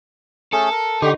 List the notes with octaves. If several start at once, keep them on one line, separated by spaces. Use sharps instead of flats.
A3 C#4 G#4 A4
A#4
D3 D#4 G4 C6 C#6